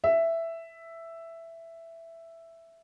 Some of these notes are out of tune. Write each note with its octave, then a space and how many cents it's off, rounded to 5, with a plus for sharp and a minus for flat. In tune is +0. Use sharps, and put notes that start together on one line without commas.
E5 +5